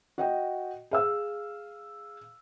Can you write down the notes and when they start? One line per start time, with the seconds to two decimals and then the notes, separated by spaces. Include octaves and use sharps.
0.18 F#4 D#5 G5
0.91 G#4 F5 E6